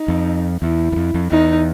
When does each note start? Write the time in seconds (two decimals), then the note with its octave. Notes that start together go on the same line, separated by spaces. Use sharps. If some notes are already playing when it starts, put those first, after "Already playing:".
Already playing: D#4
0.08 F2
0.61 E2 E4
0.92 E2
0.96 F2
1.14 F2
1.31 E2 D#4